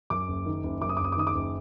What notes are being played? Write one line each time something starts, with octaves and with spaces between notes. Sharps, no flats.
F#2 D6
F#1
D#3
F#1
F#2 D6
D#6
F#1 D6
D#6
D6
D#3 D#6
D6
F#1